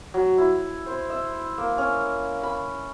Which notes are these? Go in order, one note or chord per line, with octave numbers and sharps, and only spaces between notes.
F#3
E4
C5
E5
A#3
C#4
B5